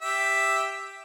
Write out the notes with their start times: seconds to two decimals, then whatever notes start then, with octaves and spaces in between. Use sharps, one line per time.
0.02 G4 E5